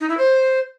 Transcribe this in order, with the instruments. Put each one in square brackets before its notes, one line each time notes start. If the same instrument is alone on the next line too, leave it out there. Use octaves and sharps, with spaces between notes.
[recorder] D#4
E4
C5